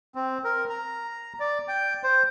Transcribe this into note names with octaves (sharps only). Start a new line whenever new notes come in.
C4
A#4
A#5
D5
G5
C5